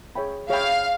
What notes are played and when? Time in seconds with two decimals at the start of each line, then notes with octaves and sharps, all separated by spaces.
0.15 G#4 C#5 E5 G5 B5
0.50 G#4 C#5 E5 F5 G5 B5